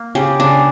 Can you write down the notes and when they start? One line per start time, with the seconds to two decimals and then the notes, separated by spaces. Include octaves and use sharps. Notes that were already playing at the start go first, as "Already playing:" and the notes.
Already playing: A#3
0.15 C#3 G4
0.40 C#3 D4